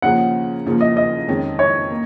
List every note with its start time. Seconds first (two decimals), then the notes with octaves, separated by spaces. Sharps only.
0.02 D#2 C#3 F3 A#3 C#4 F#5
0.66 D#2 C#3 F3 A#3
0.81 D#5
0.97 D#5
1.28 F2 D#3 G#3 C#4
1.59 C#5
1.91 A#3